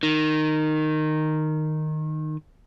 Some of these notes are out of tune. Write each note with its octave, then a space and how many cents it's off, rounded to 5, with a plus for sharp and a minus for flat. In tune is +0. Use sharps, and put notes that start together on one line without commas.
D#3 -10